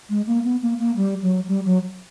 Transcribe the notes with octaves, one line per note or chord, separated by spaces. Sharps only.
G#3
A#3
B3
A#3
A#3
G3
F#3
G3
F#3